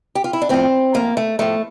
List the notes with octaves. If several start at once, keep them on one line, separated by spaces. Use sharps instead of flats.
G4
F4
E4
D4
A2 F3 C4
A2 F3 A#3
A3
A2 F3 A3